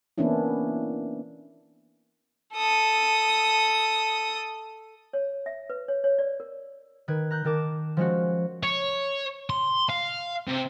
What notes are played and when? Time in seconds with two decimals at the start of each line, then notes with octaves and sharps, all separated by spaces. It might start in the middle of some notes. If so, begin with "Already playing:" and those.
0.18 E3 A#3 B3 C#4 D4 E4
2.54 A4 D#6
5.13 C#5
5.46 E5
5.70 B4
5.88 C#5
6.04 C#5
6.19 D5
6.40 A#4
7.08 D#3 B4 G#6
7.31 A#5 F#6 G6
7.44 D#3 A#4 A5 D6 E7
7.97 F3 G#3 C#4 F#4
8.63 C#5
9.50 C6
9.89 F5
10.48 C3